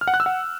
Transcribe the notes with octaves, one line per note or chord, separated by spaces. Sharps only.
F6
F#5
F#6
E6
F#5